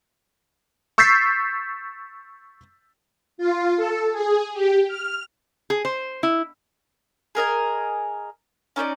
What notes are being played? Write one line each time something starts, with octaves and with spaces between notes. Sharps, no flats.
C#6 E6 G6 A6 B6 C7
F4
A4
G#4
G4
F6
G#4
C5
E4
G#4 A#4 D#5 G#5
C#4 D#4 C5 D5